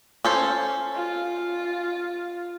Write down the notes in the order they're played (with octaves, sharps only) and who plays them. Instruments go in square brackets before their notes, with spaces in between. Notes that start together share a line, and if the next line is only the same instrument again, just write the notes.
[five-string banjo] C#4 A4 C5
[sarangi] F4